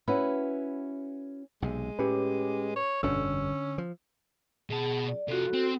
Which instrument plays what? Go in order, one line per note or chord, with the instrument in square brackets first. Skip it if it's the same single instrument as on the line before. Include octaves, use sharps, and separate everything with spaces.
[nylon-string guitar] C#4 E4 F#4 B4
[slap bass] B1 C3 [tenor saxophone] G#3
[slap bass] A2 [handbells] C#4 G4 [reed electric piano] B4
[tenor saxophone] C#5
[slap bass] G1 F2 B2 [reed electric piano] D3 [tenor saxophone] C#4 [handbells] E6
[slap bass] F3
[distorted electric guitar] B2 A5 [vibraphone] G#4
[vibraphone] D5
[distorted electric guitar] C3 F3 [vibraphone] F#4 A4
[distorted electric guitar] C4